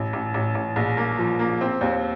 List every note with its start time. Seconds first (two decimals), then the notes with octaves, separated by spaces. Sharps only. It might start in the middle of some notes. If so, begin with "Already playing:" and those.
Already playing: A1
0.13 A1
0.34 A1
0.55 A1
0.76 A#1
0.97 A#3
1.18 F3
1.39 A#3
1.61 C4
1.81 D#2